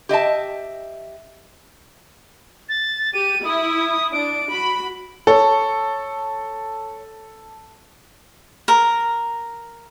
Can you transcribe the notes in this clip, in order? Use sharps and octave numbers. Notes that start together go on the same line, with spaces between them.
G4 D#5 E5 A5
A6
G4 D#7
E4 D#6
D4 D7
F#4 B5
A4 C#5
A#4